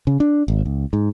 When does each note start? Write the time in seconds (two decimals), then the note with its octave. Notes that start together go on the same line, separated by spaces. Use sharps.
0.07 C#3
0.20 D4
0.48 G#1
0.65 C#2
0.93 G#2